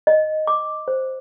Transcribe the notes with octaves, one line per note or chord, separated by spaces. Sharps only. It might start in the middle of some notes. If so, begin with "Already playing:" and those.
D#5
D6
C5